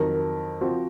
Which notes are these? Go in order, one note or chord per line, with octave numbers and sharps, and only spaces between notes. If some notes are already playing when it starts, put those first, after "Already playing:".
Already playing: F2 D#3 F#3 A#4
F3 C4 F#4